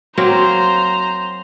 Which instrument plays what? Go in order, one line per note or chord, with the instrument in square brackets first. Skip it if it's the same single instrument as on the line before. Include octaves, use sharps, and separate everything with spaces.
[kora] F#3 A#3 C4 [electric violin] C5 A#5